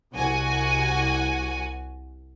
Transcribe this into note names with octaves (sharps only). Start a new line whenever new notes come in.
C2 F#4 G#5